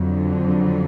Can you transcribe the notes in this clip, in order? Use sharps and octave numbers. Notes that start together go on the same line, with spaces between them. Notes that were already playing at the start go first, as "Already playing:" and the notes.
Already playing: F2 D3 F#3